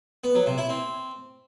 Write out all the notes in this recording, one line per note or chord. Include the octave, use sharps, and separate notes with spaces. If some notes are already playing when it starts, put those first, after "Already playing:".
B3
F#3
C3
E4
C4